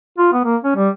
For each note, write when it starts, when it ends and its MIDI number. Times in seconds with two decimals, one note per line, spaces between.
0.18 0.29 65
0.33 0.43 59
0.45 0.56 58
0.64 0.75 61
0.76 0.89 55